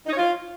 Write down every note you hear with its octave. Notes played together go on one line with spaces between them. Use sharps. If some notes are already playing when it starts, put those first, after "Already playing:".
D#4
C#5
F4